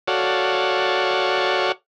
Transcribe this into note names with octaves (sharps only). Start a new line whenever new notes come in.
F#4 A4 C#5 D5 F5 F#5